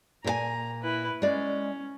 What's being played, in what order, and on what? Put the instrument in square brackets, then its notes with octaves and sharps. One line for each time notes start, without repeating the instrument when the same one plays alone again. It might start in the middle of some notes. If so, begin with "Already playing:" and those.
[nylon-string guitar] A#2 A#4 G#5 [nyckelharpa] A#5
[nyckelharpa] E4 B4
[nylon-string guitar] G#3 D5 [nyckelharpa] C#4